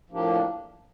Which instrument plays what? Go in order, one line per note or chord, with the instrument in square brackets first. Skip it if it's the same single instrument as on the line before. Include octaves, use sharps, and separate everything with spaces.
[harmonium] A2 F3 A#3 D4 G4